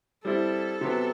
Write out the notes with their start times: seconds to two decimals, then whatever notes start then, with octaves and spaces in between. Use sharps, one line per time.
0.25 G3 C4 E4 A4
0.81 C3 F#3 B3